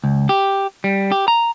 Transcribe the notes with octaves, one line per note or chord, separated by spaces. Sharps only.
C#2
G4
G3
G4
A#5